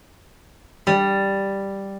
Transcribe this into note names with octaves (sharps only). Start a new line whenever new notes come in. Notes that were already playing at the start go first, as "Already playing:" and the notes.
G3